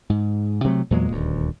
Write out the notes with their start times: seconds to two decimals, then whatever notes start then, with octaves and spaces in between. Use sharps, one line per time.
0.10 G#2
0.64 C3 F#3 A3
0.91 E2 A#2 F#3 G#3
1.11 D#1 D2